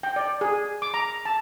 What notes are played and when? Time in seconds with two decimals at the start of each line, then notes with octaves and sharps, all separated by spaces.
0.03 G5
0.16 D5
0.41 G#4
0.82 D6
0.94 A#5
1.25 A5